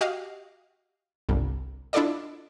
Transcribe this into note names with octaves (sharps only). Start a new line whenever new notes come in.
F#4 G4 D#5 F5
G1 C2
D4 E4 F4 A4 D5 D#5